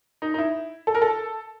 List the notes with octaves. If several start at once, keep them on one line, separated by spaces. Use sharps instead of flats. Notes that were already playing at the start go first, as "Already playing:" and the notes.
D#4
D#4
E4
A4
A#4
A4